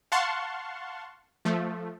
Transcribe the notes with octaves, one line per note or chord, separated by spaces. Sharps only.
F5 F#5 A5 C6 C#6
F3 A3